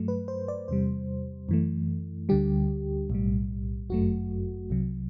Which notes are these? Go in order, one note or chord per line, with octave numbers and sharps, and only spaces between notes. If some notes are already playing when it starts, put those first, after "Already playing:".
Already playing: G2 F#3 A3
B4
C5
D5
E2 C3 G3 C5
F#2 E3 A3
D2 D3 G3 G4
B1 A2 G3
G1 F#2 F#3 A3 F#4
C2 C3 F#3